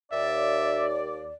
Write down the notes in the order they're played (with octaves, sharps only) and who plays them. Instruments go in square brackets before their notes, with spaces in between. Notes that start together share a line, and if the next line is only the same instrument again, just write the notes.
[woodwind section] D#2 D5 [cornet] E5